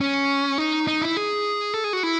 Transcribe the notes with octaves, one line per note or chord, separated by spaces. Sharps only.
C#4
D#4
D#4
E4
G#4
A4
G#4
F#4
E4